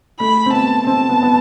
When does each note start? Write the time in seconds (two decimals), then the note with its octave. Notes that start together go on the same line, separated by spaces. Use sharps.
0.20 A3 B5
0.46 C4
0.53 B3 A5
0.87 C4 A5
1.09 B3
1.23 B3